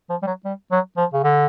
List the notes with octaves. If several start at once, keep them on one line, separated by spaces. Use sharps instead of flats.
F3
G3
F#3
G3
F#3
F3
C#3
D3